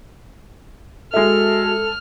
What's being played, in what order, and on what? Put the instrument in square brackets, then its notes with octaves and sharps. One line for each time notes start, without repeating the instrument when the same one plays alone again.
[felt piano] G#3 E5 [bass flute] F#4 [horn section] A4 [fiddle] F6